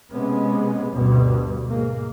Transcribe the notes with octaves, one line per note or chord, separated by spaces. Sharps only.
C3 G#3 B3 C#4
D2 G2 B2
G#2 A#3